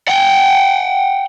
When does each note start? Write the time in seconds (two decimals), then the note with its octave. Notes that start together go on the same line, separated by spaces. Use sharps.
0.08 F#5 G5